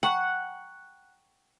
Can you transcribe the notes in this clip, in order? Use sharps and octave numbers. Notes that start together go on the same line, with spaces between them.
F#5 G5 A#5 C#6